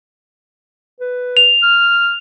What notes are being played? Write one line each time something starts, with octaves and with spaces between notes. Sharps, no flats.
B4
F7
F6